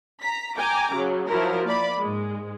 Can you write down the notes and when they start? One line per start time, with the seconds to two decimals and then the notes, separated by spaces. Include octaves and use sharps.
0.22 A#5 B6
0.57 G5 G#5 A#5 D6
0.95 C#3 F#3
1.29 F3 F#3 E4 A#4
1.66 A#3 D5 B5
2.00 G#2 G#3